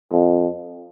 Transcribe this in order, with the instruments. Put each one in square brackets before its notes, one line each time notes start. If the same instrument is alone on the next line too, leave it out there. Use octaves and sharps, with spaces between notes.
[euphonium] F2